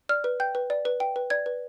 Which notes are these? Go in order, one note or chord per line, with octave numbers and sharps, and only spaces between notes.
D5 F6
B4
G5 G6
B4
D5
B4
G5
B4
D5 G#6
B4